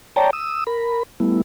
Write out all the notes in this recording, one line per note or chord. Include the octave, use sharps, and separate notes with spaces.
C#5 D5 G5 A5 A#5
D#6 E6
A#4 B5
G3 A3 B3 E4